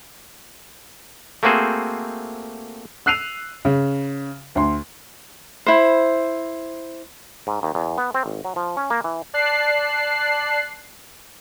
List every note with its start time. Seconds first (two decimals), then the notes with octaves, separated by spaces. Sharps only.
1.43 A3 A#3 C4 F#4 G#4 C5
3.06 E6 F#6 C7 D#7 F7
3.65 C#3
4.55 D2 C6
5.66 E4 C5
7.47 G#2
7.63 D#2
7.75 E2
7.98 B3
8.14 C4
8.26 G#1
8.45 F#3
8.56 F3
8.77 C#4
8.90 A#3
9.04 E3
9.34 D5 A5 F#6 C7